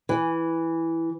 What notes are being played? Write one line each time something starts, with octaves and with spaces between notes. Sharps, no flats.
E3